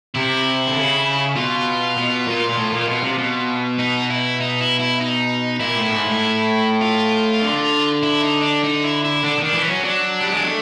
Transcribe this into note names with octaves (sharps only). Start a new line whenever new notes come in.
C3 E4
D3
C#3
B2 F4
B2
A#2
A#2
A2
A#2
B2
C3
B2
D#4
E4
D#4
E4
E4
D#4
A#2 E4
A2
G#2
A2
F4
D3
E4
D#4
D4
D#4
E4
E4
D3 D4
D#3 D4
E3
C#4
F#3
F#3 D4
G3
G#3
A3